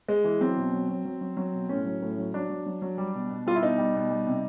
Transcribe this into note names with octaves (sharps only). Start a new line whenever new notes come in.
G#3
E3
F#3 C4
B2
F#3
F#3
F#3
F#3
F#3
B2
A2 C#4
F#3
A2
F#3
F#3 D4
F#3
F#3
F#3
G3
B2
B2
G3 F4
E4
B2 D#4
G3
B2
G3
C3